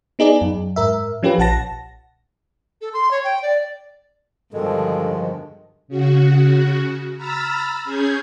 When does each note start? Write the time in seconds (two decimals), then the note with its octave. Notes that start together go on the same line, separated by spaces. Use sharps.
0.19 B3 D#4 G#4 D5
0.41 F#2
0.76 G#2 A#4 E5
1.23 F3 C#4 F4 G4 B4
1.38 A#1 F#5 A5 A#6
2.81 A4
2.93 C6
3.11 C#5
3.24 G5
3.42 D5
4.53 G2 B2 D3 D#3 F3 G#3 A4
5.88 C#3 F#4
7.16 A#5 B5 E6 F6 A6
7.84 C#4 G#4 G6 G#6